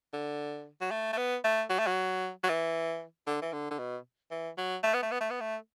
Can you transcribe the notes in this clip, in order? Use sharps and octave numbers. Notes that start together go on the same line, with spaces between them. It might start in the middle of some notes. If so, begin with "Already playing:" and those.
D3
F#3
A3
A3
B3
A3
F#3
A3
F#3
F#3
E3
D3
E3
D3
D3
B2
E3
F#3
A3
B3
A3
B3
A3
B3
A3